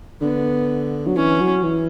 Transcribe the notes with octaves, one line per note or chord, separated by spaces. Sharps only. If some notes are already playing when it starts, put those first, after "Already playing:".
D3 B3
F#3
E3 C#4
F#3
E3